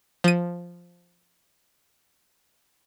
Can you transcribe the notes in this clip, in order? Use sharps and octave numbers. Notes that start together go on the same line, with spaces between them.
F3 D#7